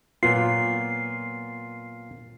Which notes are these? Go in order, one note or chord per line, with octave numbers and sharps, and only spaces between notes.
A#2 F#3 B3 F4 C7